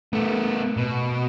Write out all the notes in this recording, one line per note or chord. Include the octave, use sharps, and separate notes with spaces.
A3 B3
B2